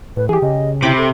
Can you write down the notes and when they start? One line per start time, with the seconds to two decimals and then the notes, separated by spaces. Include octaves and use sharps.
0.17 A2 B4
0.29 E3 G4 G#4 G#5
0.42 C#3 D#5
0.83 C3 E4 G5 B5 D6
0.97 A4